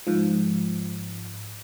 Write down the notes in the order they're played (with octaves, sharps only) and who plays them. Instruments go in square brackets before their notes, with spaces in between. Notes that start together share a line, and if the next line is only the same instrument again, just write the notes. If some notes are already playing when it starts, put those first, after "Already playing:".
[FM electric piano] G#2 F3